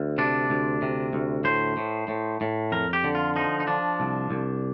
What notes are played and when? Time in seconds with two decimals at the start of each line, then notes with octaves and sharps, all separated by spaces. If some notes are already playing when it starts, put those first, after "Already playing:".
Already playing: D2
0.18 C3 D4
0.50 D2
0.82 C3
1.13 D2
1.45 A2 C5
1.77 A2
2.08 A2
2.41 A2
2.72 F2 A#4
2.93 G4
3.04 D3
3.15 F4
3.36 F3 D#4
3.60 D#4
3.67 F3 D4
4.00 C2
4.31 C2